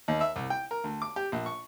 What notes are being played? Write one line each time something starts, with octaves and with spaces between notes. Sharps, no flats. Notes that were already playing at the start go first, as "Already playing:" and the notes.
D#2
E5
C2
G5
A#4
D2
D6
G4
A#1
C#6